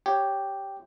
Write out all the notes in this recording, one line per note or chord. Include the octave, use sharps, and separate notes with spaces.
G4 C#5 G5